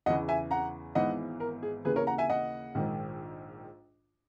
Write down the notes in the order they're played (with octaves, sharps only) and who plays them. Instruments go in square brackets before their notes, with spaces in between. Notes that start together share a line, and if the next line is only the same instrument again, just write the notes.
[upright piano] E2 C#3 E3 D#5 F#5
E5 G#5
F#5 A#5
G#1 G#2 E3 B3 D#4 D#5 F#5
A#4
G#4
D#2 C#3 E3 A#3 G#4 B4
A#4 C#5
F#5 A#5
E5 G#5
D#5 F#5
A#1 G#2 D#3